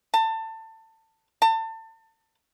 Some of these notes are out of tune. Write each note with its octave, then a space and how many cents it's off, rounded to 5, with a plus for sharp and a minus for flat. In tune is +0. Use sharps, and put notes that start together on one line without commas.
A5 +25
A5 +30